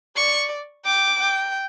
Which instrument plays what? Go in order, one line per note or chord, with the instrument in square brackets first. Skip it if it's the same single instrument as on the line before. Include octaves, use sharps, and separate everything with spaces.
[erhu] D5 [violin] C#6
[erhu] G5 [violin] D6
[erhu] G5